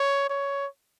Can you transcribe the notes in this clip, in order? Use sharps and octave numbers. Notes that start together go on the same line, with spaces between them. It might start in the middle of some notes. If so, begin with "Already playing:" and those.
Already playing: C#5
C#5